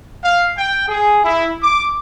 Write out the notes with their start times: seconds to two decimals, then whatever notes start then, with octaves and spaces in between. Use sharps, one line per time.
0.24 F5
0.57 G5
0.88 G#4
1.24 E4
1.63 D6